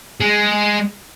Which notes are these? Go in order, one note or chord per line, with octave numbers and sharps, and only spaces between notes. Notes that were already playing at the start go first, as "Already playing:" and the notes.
G#3